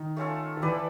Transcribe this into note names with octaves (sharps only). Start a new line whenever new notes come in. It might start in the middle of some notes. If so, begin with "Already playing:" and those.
Already playing: D#3
A3 C#4 F4 A4
D#3
E3 E4 G4 B4 D5